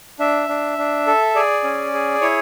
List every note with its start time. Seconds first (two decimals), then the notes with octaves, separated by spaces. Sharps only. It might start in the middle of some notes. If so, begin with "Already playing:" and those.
0.19 D4 E5
0.49 D4
0.78 D4
1.07 A4
1.35 G#4 D5
1.64 C#4
1.94 G#4
2.21 E4 C#5